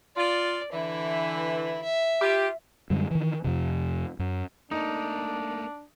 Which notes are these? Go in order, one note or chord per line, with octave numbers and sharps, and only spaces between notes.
F4 D5
D3 E3 E4
E5
F4 G4
F#2 D3 G3 G#3
D#3 E3
F2 C3
F#2
A3 A#3 D4 D#4